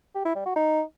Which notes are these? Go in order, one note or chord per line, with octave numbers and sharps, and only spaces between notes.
G4
E4
G3
F#4
D#4